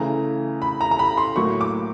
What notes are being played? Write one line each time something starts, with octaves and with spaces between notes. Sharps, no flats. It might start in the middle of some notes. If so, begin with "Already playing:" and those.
Already playing: C#3 E3 A3 A#5
B5
A#5
A#5
B5
C6
A2 F#3 A#3 C#6
D6